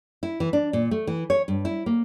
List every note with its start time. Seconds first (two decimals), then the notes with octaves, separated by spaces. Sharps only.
0.23 E4
0.40 E3
0.53 D4
0.73 A#2
0.91 A3
1.07 E3
1.30 C#5
1.48 G2
1.65 E4
1.86 A#3